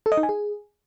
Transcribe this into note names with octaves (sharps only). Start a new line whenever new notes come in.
A4
D#5
D#4
G#5
G#4